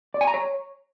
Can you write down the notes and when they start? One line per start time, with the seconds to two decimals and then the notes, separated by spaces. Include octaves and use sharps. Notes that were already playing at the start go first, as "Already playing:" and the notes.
0.14 D5
0.21 G#5
0.27 A#5
0.34 C#5